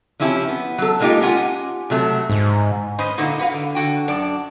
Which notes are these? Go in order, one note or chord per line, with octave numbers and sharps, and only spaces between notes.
F3 C4 C#4 E4 G4
B3
F#3 C#4 A4
G3 G#3 A#3 D#4 F4 G4
C#4 F4 G4 F#5 G#5
C3 F#3 A3
G#2
G#3 C#4 B4 C5 D#5
A#2 D3 A#3 D#4 E4 F#4
F#4 B4 F5
D3
D3 F#4 G5
F#2 D4 D5